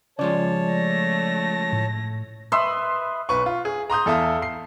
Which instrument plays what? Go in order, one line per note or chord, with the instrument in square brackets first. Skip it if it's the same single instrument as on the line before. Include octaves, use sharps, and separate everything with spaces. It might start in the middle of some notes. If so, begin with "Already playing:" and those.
[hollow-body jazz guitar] C#3 F3 G#3 [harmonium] C#5 A5 [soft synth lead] D5
[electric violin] A3 A#6
[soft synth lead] A2
[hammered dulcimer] B4 D#5 E5 C6
[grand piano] B1 B4 C#6
F4
G#4
A#5 C6 D#6 G6
E2 A4 E5 F5 D#6
C7